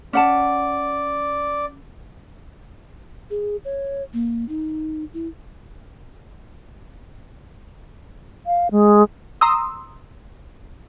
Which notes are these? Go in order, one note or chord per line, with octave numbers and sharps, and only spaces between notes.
C#4 D5 F#5 A5
G#4
C#5
A#3
D#4
E4
F5
G#3
A#5 C6 D#6 E6